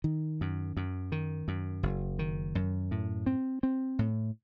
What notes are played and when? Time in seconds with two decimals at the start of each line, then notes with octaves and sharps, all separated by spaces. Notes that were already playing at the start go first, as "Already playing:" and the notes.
0.04 D#3
0.41 F#2
0.77 F#2
1.12 D#3
1.48 F#2
1.83 F#1
2.19 D#3
2.55 F#2
2.91 A2
3.26 C4
3.63 C4
3.99 A2